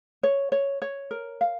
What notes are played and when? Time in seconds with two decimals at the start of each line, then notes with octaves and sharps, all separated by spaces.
0.23 C#5
0.52 C#5
0.82 C#5
1.11 A#4
1.41 F5